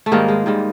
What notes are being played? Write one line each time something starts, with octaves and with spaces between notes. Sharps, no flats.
A3
G#2 D#3 G3 A#3
G#3
G#2 D#3 G3